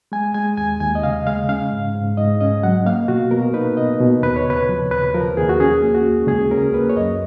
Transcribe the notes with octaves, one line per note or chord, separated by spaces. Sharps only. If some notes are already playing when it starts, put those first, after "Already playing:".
G#3 G#5
G#3 G#5
D#2 G#5
D#2 G#5
D#5
C#3 F5
G#3 F5
C#4 F5
G#2
G#2
G#2 D#5
C#4 D#5
F#3 F#5
A#3 F5
B2 F#4
B2 A#4
D#4 B4
B2 D#5
B2
D#2 B4
C#5
C#3 B4
F3
D#2 B4
F3 A#4
D#2 G#4
F#4
C#4 G#4
A#3
F#4
C#2
C#2 G#4
C#4 A#4
A#3 B4
C#5
F#2 D#5